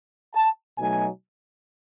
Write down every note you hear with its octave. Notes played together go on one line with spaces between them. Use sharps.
A5
B2 F#3 A3 D#4 G#5